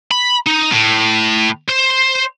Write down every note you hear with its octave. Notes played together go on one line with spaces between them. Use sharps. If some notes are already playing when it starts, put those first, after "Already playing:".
B5
D#4
A2
C5